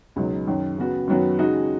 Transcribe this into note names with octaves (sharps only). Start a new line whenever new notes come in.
C#2 B2 F#3 D#4
F#2 D#3 F#3
C#3 B3 F#4
F#2 D#3 F#3 B3 F#4
C#3 G#3 D#4 F#4